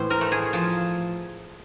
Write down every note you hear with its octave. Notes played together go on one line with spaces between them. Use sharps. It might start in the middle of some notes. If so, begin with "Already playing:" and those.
Already playing: A2 E3 C5
A#4
A3
G#4
F3